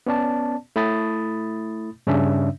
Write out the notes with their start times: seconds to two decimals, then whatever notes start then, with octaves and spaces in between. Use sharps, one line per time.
0.07 B3 C#4 D5 A5
0.76 A3 E4 B5 D#6 A6
2.07 G2 C#3 C#4 D4 E5